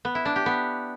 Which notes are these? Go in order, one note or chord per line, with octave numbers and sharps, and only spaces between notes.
B3
E4
D4
G4
B3